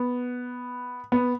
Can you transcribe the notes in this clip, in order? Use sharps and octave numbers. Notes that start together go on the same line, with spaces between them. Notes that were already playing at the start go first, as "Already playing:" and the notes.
Already playing: B3
B3